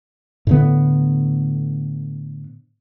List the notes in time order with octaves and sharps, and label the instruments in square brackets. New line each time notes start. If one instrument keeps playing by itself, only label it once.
[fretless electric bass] A2 D3 B3